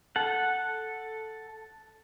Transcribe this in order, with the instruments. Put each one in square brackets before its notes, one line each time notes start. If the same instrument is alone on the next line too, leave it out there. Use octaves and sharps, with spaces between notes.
[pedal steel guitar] A4 F#5